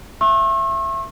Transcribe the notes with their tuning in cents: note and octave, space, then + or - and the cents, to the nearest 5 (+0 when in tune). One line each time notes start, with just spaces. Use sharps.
E5 +20 C#6 -40 E6 +0